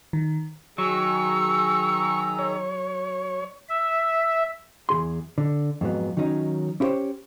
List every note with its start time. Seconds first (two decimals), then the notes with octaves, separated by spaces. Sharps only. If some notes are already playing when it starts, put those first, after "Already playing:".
0.13 D#3
0.78 D#3 F#3 G#4 A#5 C#6 E6
2.39 C#5
3.69 E5
4.89 E2 C3 G#4 C6
5.38 D3
5.81 F2 G#2 F#3 B3
6.17 D#3 F#3 C#4 D#4
6.80 C#4 E4 G4 A#4 C5 C#5